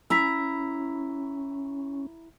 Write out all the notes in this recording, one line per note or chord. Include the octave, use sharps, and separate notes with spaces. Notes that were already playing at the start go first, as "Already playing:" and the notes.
C#4 E4 A#5 E6 B6